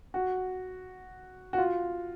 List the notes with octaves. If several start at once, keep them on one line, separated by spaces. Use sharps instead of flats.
F#4
F#4
F4